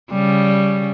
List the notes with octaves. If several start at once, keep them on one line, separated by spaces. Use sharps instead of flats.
C#3 G3